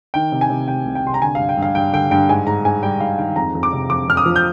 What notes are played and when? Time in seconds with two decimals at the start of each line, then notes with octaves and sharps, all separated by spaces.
0.14 D#3 G5
0.32 C3
0.41 G#5
0.50 C3
0.68 C3 G5
0.86 C2
0.95 G5
1.04 C3 C6
1.14 A#5
1.22 D3 G#5
1.35 G2 F5
1.49 G5
1.57 G2
1.62 F5
1.75 G2 G5
1.93 D3 G5
2.11 G2 G5
2.29 G#2 G#5
2.47 G#2 A#5
2.65 G#2 G#5
2.82 G3 G5
3.00 G#2 F5
3.18 D#3 G5
3.36 F2 A#5
3.55 F2
3.63 D6
3.73 C3
3.89 F2 D6
4.08 F2 F6
4.17 D#6
4.26 F3
4.36 G6